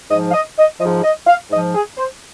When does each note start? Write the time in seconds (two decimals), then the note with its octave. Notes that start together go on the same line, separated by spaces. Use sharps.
0.10 G#2 F3 D#5
0.29 F5
0.34 D#5
0.58 D#5
0.80 G#2 F3 D#5
1.03 D#5
1.27 F5
1.51 G#2 F3 D#5
1.74 G#4
1.97 C5